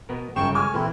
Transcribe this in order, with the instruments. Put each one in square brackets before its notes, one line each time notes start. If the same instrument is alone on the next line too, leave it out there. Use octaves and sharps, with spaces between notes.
[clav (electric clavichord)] B2 B3 A#4
[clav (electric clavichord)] G1 C#3 C5 [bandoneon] F#2 G5 C#6 [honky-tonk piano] E7
[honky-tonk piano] G#3 C#6 F6 [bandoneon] G#5
[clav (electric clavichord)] A#2 [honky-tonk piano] E3 C6 [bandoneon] C4 E4